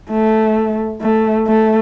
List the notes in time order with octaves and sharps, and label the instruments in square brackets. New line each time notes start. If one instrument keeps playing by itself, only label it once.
[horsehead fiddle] A3
A3
A3